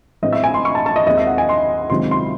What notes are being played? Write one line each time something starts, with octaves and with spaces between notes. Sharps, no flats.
A1 A2 G#3 C4 D#5
E5
G#5
C6
C#6
A5
A5
D#5
D#2 D#3 G#3 C4 D#5
E5
F#5
G#5
C6
C#2 C3 D#3 F#3 C4 C6
C6